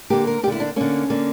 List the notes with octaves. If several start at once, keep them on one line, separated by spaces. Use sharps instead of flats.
D3 A#3 G4
A#4
D3 A#3 G4
E4
D4
D3 A#3 C#4
D3 A#3